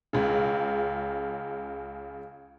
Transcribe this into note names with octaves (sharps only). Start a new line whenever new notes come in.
C#2 C#3